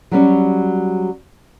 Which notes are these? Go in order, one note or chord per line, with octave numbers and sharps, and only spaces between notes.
F#3 G3 C#4